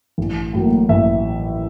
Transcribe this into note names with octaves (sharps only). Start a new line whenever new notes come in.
A1
A2 F#3 A#3
A1 E5